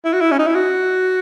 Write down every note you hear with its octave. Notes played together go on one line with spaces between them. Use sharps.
E4
F#4
E4
C#4
D#4
E4
F#4